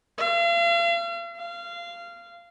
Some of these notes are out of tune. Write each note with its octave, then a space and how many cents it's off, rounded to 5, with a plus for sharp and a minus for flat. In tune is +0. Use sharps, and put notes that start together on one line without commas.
F5 -40
F5 -20